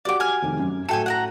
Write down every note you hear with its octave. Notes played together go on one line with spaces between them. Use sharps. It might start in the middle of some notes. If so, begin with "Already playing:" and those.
F#4 G4 D5 F#5 D6
G#5 F6
F1 D#3
F#2
A2 F#4 A4 G5 G#5 E7
F#5 G5 A#5